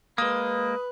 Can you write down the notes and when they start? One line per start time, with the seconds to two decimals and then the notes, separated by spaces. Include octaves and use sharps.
0.18 G#3 A#3 B4 D#6